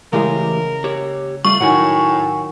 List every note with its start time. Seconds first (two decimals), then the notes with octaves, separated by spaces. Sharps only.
0.13 C#3 E3 G#3 A3 G4 A#4
0.84 G4 C#5
1.45 G3 A3 F4 C#6
1.60 A2 D#3 F#3 F#5 G#5